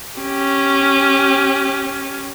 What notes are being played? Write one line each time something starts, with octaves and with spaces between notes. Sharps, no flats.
C#4 G4